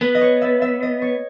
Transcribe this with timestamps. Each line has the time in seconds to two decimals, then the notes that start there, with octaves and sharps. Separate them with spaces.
0.01 B3 B4
0.15 D#5
0.21 C#5
0.41 E5
0.62 E5
0.83 D#5
1.02 C#5